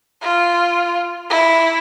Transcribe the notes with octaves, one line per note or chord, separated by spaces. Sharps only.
F4
E4